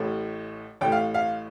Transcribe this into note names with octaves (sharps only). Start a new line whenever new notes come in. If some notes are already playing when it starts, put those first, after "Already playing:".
Already playing: A1 A2 A3
A1 A2 A3 G5
F5
F5